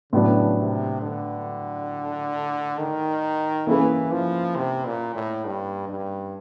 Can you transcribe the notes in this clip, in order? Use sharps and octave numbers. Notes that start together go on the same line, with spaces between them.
A2 C#3 F#3 B3 D4
C3
D3
D#3
E3 A#3 C#4 E4 G#4 B4
F3
C3
A#2
A2
G2
G2